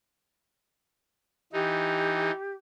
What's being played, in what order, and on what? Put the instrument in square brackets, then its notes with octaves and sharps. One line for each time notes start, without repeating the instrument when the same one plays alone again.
[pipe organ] E3 D#4 [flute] G4